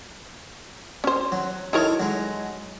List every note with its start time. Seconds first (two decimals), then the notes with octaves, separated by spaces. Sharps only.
1.04 C#4 C5
1.32 F#3
1.73 D#4 E4 A4 A#4 C#5
2.00 F#3 G#3